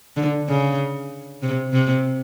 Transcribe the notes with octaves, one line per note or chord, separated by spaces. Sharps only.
D3
C#3
C3
C3